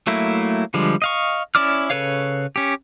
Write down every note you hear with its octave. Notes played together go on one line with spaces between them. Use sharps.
F#3 A3 A#3 E4
D3 F3 G3 G#3
D#5 F5 C#6
C#4 E4 D5 D6 F6
C#3 A4 B4 C#5 F5
C#4 G4